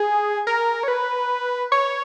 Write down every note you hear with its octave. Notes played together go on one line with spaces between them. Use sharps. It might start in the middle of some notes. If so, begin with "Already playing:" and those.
Already playing: G#4
A#4
C#5
B4
C#5